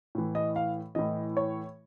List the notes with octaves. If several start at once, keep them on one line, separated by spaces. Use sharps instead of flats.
A2 E3
D#5
F5
A2 E3 D#5
C#5